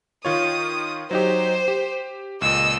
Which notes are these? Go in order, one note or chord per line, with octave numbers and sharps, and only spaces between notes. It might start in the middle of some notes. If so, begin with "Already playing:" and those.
D#3 F4 C#5 D#6
F#3 D#4 G4 C5
G4
C#2 A#2 D#5 E6